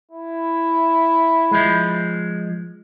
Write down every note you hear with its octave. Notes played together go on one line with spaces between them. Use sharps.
E4
F3 G#3